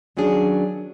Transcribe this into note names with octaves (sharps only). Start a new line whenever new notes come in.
D#3 F#3 C#4 D4 G#4